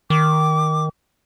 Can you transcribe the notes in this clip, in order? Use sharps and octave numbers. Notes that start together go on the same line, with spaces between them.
D#3 D6